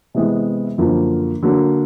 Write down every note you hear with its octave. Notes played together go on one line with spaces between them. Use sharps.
C3 E3 G#3 B3
F#2 D3 F3 A#3
D3 F#3 A#3